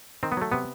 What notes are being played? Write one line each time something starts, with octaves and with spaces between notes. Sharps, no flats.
D#3 C4
B3
F#3 A3
C3 B3